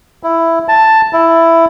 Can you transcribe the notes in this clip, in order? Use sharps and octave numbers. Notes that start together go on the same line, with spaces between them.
E4
A5
E4